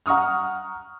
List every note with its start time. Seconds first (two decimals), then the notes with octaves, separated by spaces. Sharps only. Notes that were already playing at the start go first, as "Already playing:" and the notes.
0.06 F#5 A#5 C#6 D#6 F6